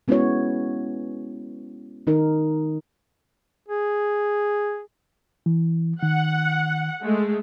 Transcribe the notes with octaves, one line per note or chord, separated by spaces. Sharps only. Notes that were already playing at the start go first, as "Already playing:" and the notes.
G#3 B3 C#4 E4 F#4 C#5
D#3 D#4 A#4
G#4
E3
D#3 F#5
G#3 A3